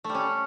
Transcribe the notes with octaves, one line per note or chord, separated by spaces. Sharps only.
A3
G3
C#4